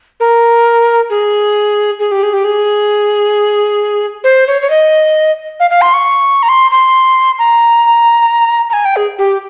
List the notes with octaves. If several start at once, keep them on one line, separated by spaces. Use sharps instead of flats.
A#4
G#4
G#4
G4
G#4
G4
G#4
C5
C#5
C#5
D#5
F5
F5
C6
C#6
A#5
C6
C6
A#5
A#5
G#5
G5
G#4
G4